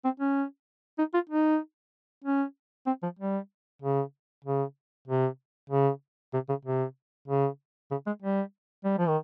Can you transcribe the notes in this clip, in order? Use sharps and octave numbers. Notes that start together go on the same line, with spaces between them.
C4
C#4
D#4
F4
D#4
C#4
C4
F3
G3
C#3
C#3
C3
C#3
C3
C#3
C3
C#3
C#3
G#3
G3
G3
F3
D#3